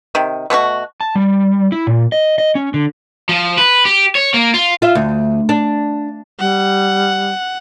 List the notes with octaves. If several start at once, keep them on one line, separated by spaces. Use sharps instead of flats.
C3 D#3
B2 A3 D4 F#4
A5
G3
E4
A#2
D#5
D#5
C#4
D3
F3
B4
G4
C#5
A#3
F4
F4 E5
D2
D4
G3 F#5